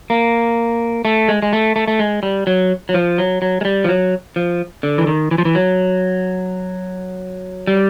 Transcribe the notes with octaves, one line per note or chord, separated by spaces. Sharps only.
A#3
A3
G#3
G#3
A3
A3
A3
G#3
G3
F#3
F#3
F3
F#3
F#3
G#3
G3
F3
F#3
F3
D3
E3
D#3
E3
F3
E3
F#3
G3